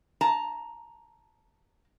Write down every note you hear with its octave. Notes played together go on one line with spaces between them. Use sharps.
A5 A#5